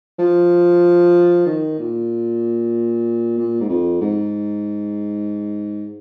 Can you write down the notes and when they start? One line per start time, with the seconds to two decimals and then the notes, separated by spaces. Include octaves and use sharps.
0.19 F3
1.46 D#3
1.79 A#2
3.38 A#2
3.61 G#2
3.69 F2
4.01 G#2